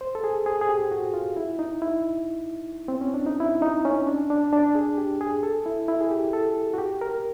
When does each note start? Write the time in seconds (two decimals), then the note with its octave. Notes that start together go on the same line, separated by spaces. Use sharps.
0.01 C5
0.15 A4
0.24 G#4
0.46 G#4
0.61 G#4
0.69 G4
0.91 F#4
1.14 F4
1.37 E4
1.59 D#4
1.82 E4
2.88 C4
3.01 C#4
3.14 D4
3.27 D#4
3.40 E4
3.62 D#4
3.85 C#4
4.07 D4
4.30 D4
4.53 D4
4.75 G#4
4.98 G4
5.21 G#4
5.43 A4
5.66 E4
5.88 E4
6.01 G#4
6.11 G4
6.33 A4
6.74 F#4
6.78 G4
7.01 A#4